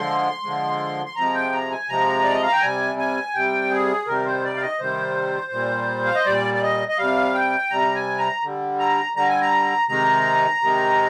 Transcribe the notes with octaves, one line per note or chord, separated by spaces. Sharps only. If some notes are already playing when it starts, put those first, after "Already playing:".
Already playing: D3 F3 G#3 C6
D3 F3 G#3
C6
C3 F3 G#3 A#5
G5
A#5
G#5
C3 F3 G#3 A#5
D5
D#5
F5
G5
C3 G3 G#5
G#5
C3 G3 G5
G#4
C3 D#3 G3 A#4
C5
D5
F5
D#5
C3 D#3 G3 C5
A#2 G3
F5
D#5
A#2 G3 D5
D5
D#5
D#5
C3 G3 F5
G5
C3 G3 A#5
G#5
A#5
D3 G3
A#5
D3 G3 A#5
G#5
A#5
C3 D#3 G#3 A#5
C3 D#3 G#3